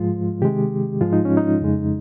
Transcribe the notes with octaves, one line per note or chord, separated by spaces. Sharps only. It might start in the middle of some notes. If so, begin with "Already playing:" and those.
Already playing: G#2 F3 G#3 F4
C3 D#3 G#3 G4
G#2 F3 G#3 F4
D#4
C#4
D#4
F2 C#3 G#3